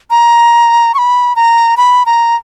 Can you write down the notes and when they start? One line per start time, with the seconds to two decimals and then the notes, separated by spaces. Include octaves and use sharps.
0.11 A#5
0.95 C#6
0.98 B5
1.36 A#5
1.77 B5
2.06 A#5